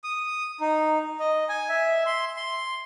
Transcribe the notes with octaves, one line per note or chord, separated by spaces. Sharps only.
D#6
D#4
D#5
G#5
E5
C6
C6